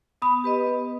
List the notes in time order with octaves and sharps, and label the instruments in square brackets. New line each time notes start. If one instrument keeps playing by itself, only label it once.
[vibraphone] B3 [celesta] B5 D#6
[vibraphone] G4 B4 D#5
B3